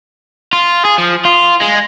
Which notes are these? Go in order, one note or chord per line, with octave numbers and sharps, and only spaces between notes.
F4
G#4
F3
F4
G#3